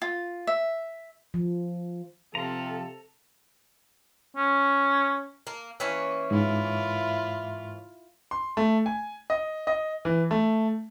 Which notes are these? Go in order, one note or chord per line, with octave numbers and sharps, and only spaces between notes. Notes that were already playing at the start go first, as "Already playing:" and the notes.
F4
E5
F3
C3 F3 A4 A#5
C#4
A#3
E3 A#3 C#4
G#2 E4 F4
C6
A3
G#5
D#5
D#5
E3
A3